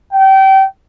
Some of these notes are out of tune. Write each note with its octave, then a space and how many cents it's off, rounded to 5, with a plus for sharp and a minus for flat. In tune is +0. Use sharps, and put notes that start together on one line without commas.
G5 -30